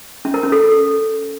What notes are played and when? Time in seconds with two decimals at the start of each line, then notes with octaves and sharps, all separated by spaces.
0.25 C#4
0.34 A#4
0.43 C#4
0.52 A4